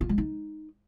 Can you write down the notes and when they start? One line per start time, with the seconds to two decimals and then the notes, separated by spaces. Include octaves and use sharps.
0.01 F4
0.09 G#3
0.18 D#4